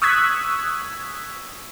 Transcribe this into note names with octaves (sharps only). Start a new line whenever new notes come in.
C#6 D#6 E6 F#6 G#6 B6